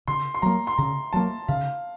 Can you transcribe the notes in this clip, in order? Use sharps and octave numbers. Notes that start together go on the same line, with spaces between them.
C#3 C6
C6
F#3 A#3 A#5
C6
C#3 A#5
F#3 A#3 A5
C#3 F5